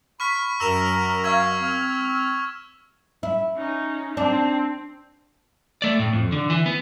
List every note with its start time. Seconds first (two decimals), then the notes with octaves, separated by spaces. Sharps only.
0.20 B5 C#6 F6 B6
0.60 F#2 A#4 A#5 E6 E7 F7
1.24 F5 C#6 E6 G#6
1.60 C4 F6
3.23 E4
3.56 C#4 D#4
4.17 C4 D4
5.82 A3 D5
5.99 A2
6.13 F2
6.32 D3
6.50 E3
6.66 B3